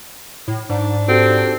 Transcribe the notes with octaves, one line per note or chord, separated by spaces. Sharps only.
A2
G#2 D4
C4 F#4 G4 A4